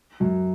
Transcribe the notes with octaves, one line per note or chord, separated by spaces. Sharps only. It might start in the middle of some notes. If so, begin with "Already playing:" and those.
F#2 F#3